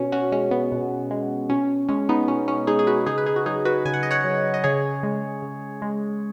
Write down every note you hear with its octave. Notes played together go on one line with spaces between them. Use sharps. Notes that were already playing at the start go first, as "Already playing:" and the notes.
Already playing: B2 C#4
C#4 F#4
G#3 C#4
B3
B2
G#3
B2 C#4
G#3 C#4
B3 D#4
B2 C#4
C#4
G#3 D#4 G#4
G#4
F#4 B4
C#3 D#4 G#4
B4
D#4 G#4
F#4
F#3 D#4 G#4
F#4 B4
C#3 G#5
F#5
D#5
C#5 F#5
F#3
D#5
C#3 G#4 C#5
G#3
C#3
G#3